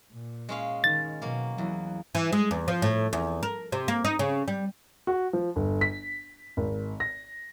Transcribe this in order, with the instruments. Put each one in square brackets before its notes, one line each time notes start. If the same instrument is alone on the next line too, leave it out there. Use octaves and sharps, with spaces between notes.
[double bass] A#2
[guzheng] G#3 C#4 F5
[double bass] D#3 [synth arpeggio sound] A6
[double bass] B2 [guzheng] F#3 A#3
[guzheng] E2 [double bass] F#3
[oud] E3
G#3
E2
F3
A2
E2
A#4
C3
A#3
D#4
C#3
G3
[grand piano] F#4
F3
G1
B6
G#1
A#6